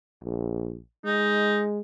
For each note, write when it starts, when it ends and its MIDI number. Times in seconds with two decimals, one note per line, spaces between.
0.24 0.79 34
1.05 1.80 56
1.05 1.60 63